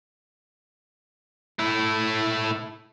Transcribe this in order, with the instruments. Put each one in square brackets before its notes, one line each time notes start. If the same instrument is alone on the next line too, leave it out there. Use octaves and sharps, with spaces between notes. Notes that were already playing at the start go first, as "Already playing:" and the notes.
[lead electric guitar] A3 E4